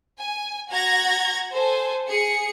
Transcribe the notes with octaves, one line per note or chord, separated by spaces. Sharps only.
G#5
F#4 F#5 A#5 G#6 A#6
A4 C5 G#5
G#4 C#7